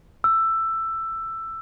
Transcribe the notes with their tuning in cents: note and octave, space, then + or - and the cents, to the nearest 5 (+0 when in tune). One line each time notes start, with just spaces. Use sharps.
E6 +10